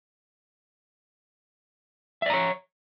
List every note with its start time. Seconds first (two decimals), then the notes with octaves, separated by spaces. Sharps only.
2.22 E5
2.26 D5
2.30 A#5
2.34 C#5